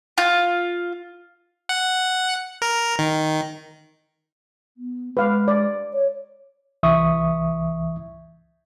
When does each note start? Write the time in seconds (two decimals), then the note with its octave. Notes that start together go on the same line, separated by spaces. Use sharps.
0.18 F4
1.69 F#5
2.62 A#4
2.99 D#3
4.77 B3
5.17 G#3 B4 F5 D6
5.48 D5
5.93 C#5
6.83 C2 E3 E5 C#6 D#6